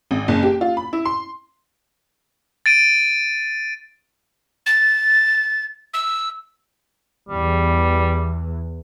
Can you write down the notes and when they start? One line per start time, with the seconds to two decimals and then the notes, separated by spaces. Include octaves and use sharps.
0.11 G#1
0.28 F#1
0.43 G4
0.61 F4
0.77 B5
0.93 E4
1.05 C6
2.66 A6 D7 D#7
4.66 A6
5.94 E6
7.29 E2 E3 G3